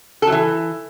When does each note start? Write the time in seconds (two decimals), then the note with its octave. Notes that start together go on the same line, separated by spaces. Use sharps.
0.22 A4
0.27 F#3
0.32 E3